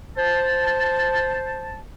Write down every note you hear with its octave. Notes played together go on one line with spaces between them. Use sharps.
C5 A5